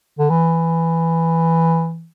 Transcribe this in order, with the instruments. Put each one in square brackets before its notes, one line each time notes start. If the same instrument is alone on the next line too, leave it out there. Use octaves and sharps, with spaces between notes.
[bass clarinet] D3
E3